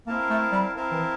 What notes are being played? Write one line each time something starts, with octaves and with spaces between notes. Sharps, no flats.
A#3 C4 E4 A#4 F5 A5
A3
G3
C4 E4 A#4 F5 A5
E3